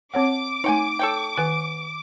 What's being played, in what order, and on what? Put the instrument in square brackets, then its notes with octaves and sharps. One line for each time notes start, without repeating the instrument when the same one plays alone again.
[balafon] C4 C#5 F#5 [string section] D6
[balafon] A3 D#4 [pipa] C#5 G5 G#5
[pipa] A4 C#5 G5
[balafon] D#3 G#5 [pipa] B3